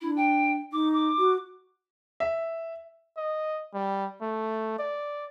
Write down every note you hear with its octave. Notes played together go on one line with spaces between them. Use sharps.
D4 E4
G5
D#4 D6
D6
F#4
E5
D#5
G3
A3
D5